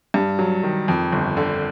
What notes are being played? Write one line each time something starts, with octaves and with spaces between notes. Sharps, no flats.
G2
F#3
D#3
F2
G1
D3